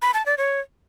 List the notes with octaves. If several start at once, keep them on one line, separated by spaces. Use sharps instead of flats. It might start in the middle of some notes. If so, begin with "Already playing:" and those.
B5
A5
D5
C#5